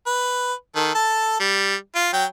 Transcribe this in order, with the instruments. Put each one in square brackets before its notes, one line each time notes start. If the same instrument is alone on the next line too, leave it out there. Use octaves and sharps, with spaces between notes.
[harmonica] B4
D#3 A4
A4 A5
G3
F4
F#3 G5